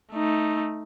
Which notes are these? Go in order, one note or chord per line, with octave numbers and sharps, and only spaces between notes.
A3 D#4